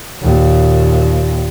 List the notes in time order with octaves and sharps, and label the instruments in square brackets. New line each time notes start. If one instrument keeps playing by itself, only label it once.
[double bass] D#2 A#2